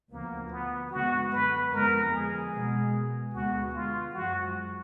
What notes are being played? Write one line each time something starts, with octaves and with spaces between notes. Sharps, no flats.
D2 D3 F3 A#3 B3
B3
F#2 D3 G#3 B3 F#4
B4
F2 D3 G#3 B3 A#4
G#4
B2 G#3 B3
D2 D3 G#3 B3 F#4
F4
F#2 F3 G#3 F#4